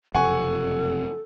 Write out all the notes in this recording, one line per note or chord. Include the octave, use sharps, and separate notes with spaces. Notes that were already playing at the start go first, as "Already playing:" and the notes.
F#1 F2 C3 A4 F#5 G#5 C#6